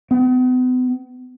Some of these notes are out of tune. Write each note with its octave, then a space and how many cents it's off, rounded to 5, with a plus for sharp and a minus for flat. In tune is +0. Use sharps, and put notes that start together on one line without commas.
B3 +40